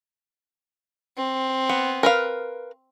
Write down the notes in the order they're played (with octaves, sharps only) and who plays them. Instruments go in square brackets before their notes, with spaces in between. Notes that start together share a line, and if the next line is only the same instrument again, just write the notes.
[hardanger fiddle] C4
[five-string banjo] B3
A#4 B4 F5